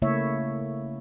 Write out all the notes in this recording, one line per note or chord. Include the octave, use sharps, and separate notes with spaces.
C#3 A3 A#3 E4 C#5 E5